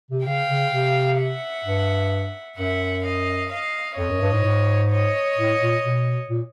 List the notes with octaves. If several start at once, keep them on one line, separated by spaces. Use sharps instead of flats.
C3
C#3 F5 G5
C#3
C3
E5 F#5
G2
F#2 E5 F#5
D#5 F5
D#5 F5
F2 C#5 D#5
F#2
G2
G#2
G#2
C#5 D#5
A2
A#2
B2
A#2